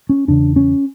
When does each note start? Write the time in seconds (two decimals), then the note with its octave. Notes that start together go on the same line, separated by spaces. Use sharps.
0.09 C#4
0.28 E2 C#3 D4
0.56 C#4